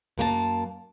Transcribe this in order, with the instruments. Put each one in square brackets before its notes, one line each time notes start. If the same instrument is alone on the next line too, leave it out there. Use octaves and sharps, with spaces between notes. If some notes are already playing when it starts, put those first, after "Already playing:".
[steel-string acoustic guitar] F#2 A#3 G4 A5